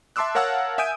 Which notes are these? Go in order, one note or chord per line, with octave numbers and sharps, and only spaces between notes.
E5 A5 C6 D6 E6 F#6
A#4 C#5 F5 F#5 A5 E6
E5 G#5 D#6 G6 D7 D#7